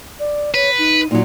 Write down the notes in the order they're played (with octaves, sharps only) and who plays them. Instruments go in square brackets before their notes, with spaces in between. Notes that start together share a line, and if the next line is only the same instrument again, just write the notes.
[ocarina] D5
[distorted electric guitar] B4 [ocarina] C#5
[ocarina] D#4
[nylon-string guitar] A#2 F#3 [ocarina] D#4